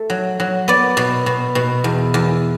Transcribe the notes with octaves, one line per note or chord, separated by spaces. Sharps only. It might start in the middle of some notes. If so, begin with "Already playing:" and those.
Already playing: A3
F#3
F#3
B3 D5
B2
B2
B2
E2
E2